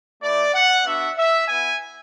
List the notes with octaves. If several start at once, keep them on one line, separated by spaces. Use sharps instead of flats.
A3 E4 D5
F#5
B3 D4 F#4 E5
E5
B3 E4 G#5